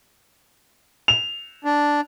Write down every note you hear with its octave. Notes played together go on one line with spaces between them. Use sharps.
F7
D4